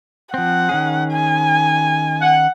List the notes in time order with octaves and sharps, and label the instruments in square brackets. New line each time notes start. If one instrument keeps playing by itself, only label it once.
[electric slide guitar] F3 C4 [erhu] F#5
[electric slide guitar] D#3 C#4 G#4
[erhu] G#5
[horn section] F#5